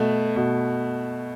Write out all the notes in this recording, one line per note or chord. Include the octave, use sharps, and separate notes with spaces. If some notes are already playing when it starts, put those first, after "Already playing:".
Already playing: B2 A3
B2